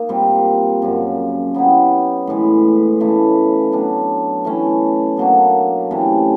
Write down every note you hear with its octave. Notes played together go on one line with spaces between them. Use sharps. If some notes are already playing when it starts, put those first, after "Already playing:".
Already playing: A#3 D#4
A#2 G3 C4
F#2 C#3 F3
F#3 B3 E4 G4
A2 E3 G#3
C#3 E3 A3
F#3 B3 D4
E3 A3 C#4
B2 F#3 A#3 D4
C3 E3 A3 C#4